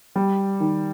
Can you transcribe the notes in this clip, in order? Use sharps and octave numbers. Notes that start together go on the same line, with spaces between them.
G3
D#3